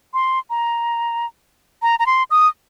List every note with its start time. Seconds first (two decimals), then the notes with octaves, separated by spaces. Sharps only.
0.14 C6
0.50 A#5
1.82 A#5
1.99 A#5
2.06 C6
2.31 D#6